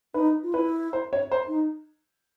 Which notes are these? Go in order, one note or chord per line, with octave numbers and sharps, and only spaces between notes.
D#4 B4
F4
E4 B4
C5
C#5
C5
D#4